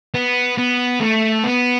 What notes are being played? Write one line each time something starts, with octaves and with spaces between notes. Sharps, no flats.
B3
B3
A3
B3